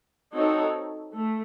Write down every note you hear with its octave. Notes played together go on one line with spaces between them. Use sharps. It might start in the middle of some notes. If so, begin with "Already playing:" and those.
C4 D#4 F#4 A4 C#5
A3